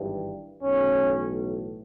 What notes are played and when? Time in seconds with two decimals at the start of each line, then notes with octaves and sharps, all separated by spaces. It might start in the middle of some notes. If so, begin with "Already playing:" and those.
Already playing: G#1 G2 E3
0.63 B1 A2 E3 C#4